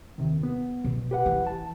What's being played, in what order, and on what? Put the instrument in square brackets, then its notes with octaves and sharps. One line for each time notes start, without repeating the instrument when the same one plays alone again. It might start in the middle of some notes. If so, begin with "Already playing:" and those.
[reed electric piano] D#2 C3 D#3
B3
[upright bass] B2
[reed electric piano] G4 B4 F#5
[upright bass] E3
[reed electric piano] A5